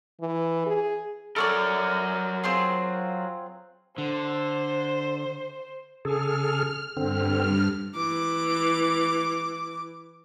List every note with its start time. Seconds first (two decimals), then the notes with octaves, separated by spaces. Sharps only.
0.21 E3
0.66 G#4
1.36 F#3 A4 A#4 C#5 D5
2.44 C4 F4 G#4
3.98 D3 C5
6.05 C#3 G#4 A4 F6
6.97 G2 D3 C4 F6
7.95 E3 D6